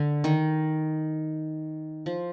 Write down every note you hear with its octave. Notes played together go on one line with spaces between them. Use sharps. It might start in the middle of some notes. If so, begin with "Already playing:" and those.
Already playing: D3
D#3
F3